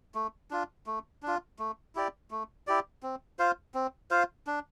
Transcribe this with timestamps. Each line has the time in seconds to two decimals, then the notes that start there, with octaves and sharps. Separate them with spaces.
0.15 A3
0.51 D4 F4
0.86 A3
1.23 D4 F4
1.59 A3
1.95 E4 G4 D5
2.31 A3
2.67 E4 G4 D5
3.03 C4
3.39 F4 C5 F5
3.74 C4
4.11 F4 C5 F5
4.47 D4